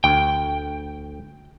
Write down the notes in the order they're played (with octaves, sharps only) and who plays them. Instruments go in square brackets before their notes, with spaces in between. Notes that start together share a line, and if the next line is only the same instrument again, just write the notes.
[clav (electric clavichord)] D2 [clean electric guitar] G5